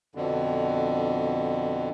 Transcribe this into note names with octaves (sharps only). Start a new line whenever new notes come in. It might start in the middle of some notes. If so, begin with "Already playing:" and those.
F2 B2 D3